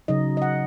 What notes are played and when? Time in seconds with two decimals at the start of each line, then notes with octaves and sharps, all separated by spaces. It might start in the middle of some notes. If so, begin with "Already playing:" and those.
0.08 C#3 F#3 D#4 D#5
0.37 D#5
0.42 F#5